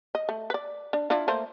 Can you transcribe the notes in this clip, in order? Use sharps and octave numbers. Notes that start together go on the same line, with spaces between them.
D#5
A3
B4 D5
D4
D4 E4 F4
A3 A#3 C5